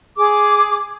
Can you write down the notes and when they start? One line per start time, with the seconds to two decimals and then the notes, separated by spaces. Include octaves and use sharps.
0.17 G#4 D6